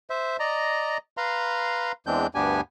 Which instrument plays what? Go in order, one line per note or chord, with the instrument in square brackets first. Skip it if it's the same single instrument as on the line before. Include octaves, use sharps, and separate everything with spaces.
[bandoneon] C5 E5
D5 D#5 A#5
B4 F5 A#5 C6
E2 E3 G#3 C4 D4 G6
D2 G2 B3 D4 G4 G#5